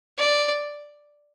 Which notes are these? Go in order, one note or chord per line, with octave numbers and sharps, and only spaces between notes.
D5